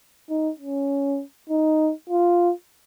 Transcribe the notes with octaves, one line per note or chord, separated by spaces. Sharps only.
D#4
C#4
D#4
F4